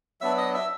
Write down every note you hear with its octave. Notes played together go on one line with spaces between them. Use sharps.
F#3 B3 D4 E5 E6
D#5 D#6
E5 E6